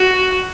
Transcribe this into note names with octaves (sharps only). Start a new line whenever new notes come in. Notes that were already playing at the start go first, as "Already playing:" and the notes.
Already playing: F#4